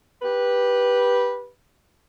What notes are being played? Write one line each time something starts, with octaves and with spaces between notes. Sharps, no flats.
G4 B4